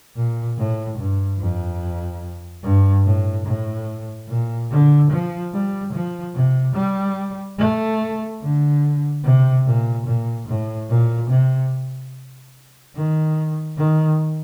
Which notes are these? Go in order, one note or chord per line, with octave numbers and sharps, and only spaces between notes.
A#2
A2
G2
F2
G2
A2
A2
A#2
D3
F3
G3
F3
C3
G3
A3
D3
C3
A#2
A#2
A2
A#2
C3
D#3
D#3